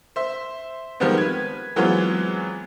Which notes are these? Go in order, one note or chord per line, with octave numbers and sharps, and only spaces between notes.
C5 E5
D#3 F3 G3 G#3 B3 C4
B4 G#6
E3 F#3 G#3 B3 C4 F4